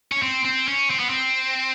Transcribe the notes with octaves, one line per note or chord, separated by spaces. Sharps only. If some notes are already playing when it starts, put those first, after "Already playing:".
C#4
C4
C4
C#4
C4
B3
C4